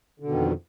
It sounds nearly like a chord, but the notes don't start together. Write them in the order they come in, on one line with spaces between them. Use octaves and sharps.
D3 B2 D#3 F2